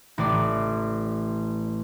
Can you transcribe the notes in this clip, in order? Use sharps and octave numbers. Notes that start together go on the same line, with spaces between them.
A1 D5